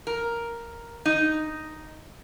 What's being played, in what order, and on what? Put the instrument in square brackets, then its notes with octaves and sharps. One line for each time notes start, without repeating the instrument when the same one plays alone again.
[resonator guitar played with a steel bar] A#4
D#4